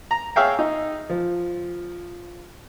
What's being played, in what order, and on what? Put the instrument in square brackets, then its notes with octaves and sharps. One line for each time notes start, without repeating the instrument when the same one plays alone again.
[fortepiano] A#5
G#4 C#5 E5 F5 G5
D#4
F3